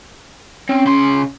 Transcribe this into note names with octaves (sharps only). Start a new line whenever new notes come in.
C4 C#4
C#3 C6